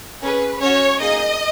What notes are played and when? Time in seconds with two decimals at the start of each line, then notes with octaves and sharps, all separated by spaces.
0.22 C#4 G#4 B4
0.62 C#4 F#4 C#5
1.00 A#3 D#4 G#4 D#5